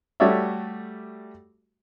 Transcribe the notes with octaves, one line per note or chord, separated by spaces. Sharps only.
G3 A3 F#4 C#5 D5 E5